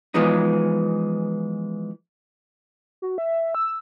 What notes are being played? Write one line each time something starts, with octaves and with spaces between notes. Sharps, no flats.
E3 F3 G#3 B3 D#4
F#4
E5
E6